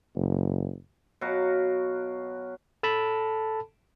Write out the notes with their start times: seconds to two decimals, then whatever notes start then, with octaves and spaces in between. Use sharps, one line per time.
0.16 F#1
1.21 B2 F#3 F#4 F5
2.83 A4 A5 B5